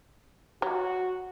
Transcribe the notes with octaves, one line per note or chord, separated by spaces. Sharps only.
F#3 F#4